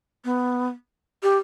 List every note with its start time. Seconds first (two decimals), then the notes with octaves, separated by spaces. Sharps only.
0.25 B3
1.23 G4